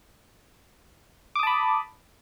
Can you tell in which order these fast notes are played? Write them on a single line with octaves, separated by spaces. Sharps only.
D6 D#6 A5 B5